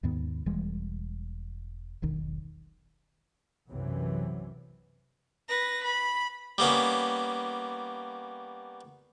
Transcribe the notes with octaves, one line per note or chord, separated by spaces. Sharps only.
D#2 G#2 D#3 B3
E1 E3 G3 G#3
E1 B1 D#3
B1 F#2 C3 E3 F#3
B4 A#6
B5
G3 A#3 B3 C#4